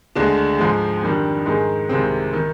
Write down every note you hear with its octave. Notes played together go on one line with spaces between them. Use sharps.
D2 D3 G#3 D4
G#2 F3 G#3
F2 D#3 G3 D4
G#2 D#3 G#3
C2 C3 D#3 G#3 C4
D#3